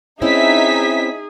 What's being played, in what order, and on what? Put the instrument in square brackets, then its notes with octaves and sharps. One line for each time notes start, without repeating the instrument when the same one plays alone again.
[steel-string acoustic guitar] C4 C#4 E4 [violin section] D#4 E5 B6 [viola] G#4